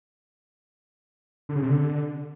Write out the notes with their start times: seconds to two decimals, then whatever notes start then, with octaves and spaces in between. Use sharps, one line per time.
1.49 D3
1.56 C#3
1.62 C3
1.69 D3